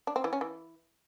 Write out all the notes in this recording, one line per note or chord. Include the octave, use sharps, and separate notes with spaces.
D4
C4
E3
C#4
E3